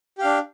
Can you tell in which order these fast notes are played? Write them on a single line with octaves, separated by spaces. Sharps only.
G4 F5 D4